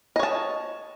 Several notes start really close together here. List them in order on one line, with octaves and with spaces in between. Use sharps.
D#5 C#5 A5